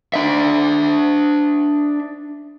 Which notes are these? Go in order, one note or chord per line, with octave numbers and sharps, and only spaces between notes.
D4 E5